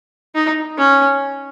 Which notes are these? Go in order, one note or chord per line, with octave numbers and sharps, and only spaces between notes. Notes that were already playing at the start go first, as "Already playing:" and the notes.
D#4
C#4